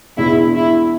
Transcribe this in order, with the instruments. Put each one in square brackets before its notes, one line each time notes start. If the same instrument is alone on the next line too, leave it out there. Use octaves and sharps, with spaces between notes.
[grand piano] E2 B2 G#3 B3 D4 [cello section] E4
[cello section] E4